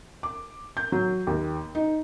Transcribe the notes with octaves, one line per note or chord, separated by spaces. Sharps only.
D6
G6
F#3
D#2
D#4